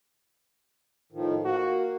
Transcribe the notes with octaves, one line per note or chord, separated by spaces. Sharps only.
A2 D#3 F3
A#3 F#4